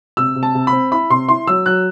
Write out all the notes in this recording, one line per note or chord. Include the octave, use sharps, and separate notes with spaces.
C3 E6
C3
A5
C3
B5
C4
E4 B5
C3 C6
E4 C6
F#3 E6
F#3 F#6